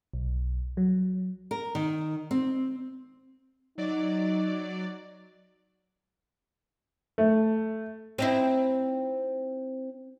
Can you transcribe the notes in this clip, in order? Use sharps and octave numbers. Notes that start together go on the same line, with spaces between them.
B1
F#3
A#4
D#3
C4
F#3 D#4 D5
A3
C4 D#4 E4